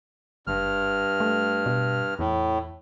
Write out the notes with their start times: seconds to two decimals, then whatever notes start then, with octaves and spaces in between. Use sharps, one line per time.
0.47 F#1 G2 F6
1.20 A3
1.66 B2
2.19 E2 A2